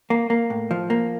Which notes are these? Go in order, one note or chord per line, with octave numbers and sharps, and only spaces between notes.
A#3
A#3
A2
F3
A#3